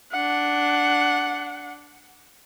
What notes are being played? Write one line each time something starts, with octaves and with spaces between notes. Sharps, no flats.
D4 F#5